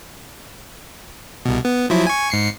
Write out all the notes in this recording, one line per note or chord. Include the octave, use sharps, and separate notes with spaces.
C2 B2
B3
F3 F#3 E4
G#5 C#6
G#2 C7 C#7